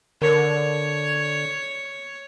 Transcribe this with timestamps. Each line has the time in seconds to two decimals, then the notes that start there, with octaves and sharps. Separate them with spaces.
0.22 D3 A#4 C#5